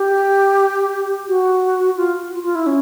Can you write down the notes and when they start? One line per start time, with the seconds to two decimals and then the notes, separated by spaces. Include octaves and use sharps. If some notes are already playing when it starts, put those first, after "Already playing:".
Already playing: G4
1.28 F#4
1.97 F4
2.32 F4
2.43 F4
2.55 E4
2.66 C#4